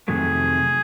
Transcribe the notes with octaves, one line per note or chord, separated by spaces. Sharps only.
F2 C3 D#3 F#3 A3 G#4